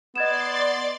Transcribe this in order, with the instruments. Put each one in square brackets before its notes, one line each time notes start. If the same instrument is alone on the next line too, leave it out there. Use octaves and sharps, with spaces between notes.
[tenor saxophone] B3 [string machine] D5 C6 A6 [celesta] D#5 G#6 E7